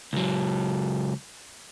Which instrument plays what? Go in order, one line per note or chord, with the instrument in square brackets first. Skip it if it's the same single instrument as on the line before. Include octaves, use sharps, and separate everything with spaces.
[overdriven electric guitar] C#2 F#3